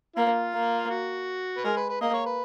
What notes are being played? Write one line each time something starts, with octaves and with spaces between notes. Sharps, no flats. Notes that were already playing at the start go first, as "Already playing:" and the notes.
A#3 F4
A#3
F#4
B4
G#3 A#4
B4
B4
A#3 D#5
C#5
B4